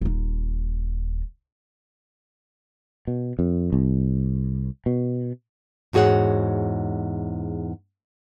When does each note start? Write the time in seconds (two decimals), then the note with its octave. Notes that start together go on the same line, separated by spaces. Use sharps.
0.01 D#1 D#4
3.07 B2
3.39 F2
3.73 C2
4.86 B2
5.93 E2 G#2 F#4 G#4 C#5 F#5